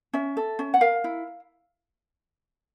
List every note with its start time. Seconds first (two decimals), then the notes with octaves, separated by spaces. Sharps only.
0.13 C#4 E5
0.37 A4
0.59 C#4
0.74 F#5
0.81 A#4 F5
1.04 E4